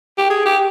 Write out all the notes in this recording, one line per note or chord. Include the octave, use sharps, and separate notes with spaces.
G4
G#4
G4